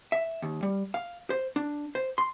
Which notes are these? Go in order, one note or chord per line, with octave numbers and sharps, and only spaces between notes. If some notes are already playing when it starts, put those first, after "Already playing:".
E5
D#2
G3
F5
C5
D4
C5
C6